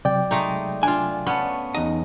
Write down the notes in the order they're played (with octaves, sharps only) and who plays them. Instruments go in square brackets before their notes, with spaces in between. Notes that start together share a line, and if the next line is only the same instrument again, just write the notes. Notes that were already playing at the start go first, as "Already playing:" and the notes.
[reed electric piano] C3 F#3 G5 [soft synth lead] D5
[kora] G#3 A3 D#4
[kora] D4 F4 [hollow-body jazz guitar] G#5
[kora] B3 C#4 [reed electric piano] A5 C#6
[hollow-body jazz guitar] E2 D#5 [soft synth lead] D#4